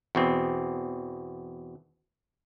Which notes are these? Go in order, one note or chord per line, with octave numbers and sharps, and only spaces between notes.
E2 B2 C4